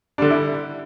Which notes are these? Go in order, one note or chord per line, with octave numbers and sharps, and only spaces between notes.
D3 G3 D4
E4